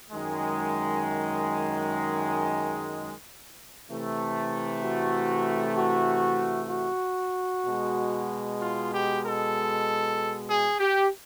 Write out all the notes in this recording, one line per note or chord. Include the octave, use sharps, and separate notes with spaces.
F#2 D#3 G#3
C3 E3 A3
F#4
F#4
F#4
B2 G#3
F4
G4
A4
G#4
G4